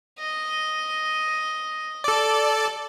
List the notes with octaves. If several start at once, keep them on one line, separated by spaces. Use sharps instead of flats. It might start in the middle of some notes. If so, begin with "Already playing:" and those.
D#5
A4 D5